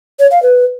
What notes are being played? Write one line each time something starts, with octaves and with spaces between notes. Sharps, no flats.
C#5
F5
B4